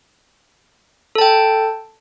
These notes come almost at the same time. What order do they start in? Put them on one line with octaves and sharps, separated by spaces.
A4 A5 G5